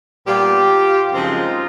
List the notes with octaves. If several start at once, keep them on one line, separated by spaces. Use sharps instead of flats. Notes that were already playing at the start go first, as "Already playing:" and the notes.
A#2 G3 B3 F4 G4
F#2 C#3 F3 G#3 C4 D#4 F4